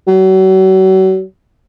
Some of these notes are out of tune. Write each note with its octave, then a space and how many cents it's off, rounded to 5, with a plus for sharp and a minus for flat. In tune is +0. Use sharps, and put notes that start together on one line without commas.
F#3 +35